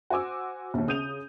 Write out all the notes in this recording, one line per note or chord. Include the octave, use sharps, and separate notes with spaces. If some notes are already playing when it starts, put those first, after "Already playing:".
F#4 C5 G#5 D6 E6
A#1 D#2
C#3 D#6 G6 D#7 F7